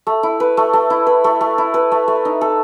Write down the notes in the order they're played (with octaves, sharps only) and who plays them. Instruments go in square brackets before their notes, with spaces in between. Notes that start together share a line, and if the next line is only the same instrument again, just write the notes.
[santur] A3
E4
B4
A3
A3
E4
B4
A3
A3
E4
B4
A3
A3
D#4
A4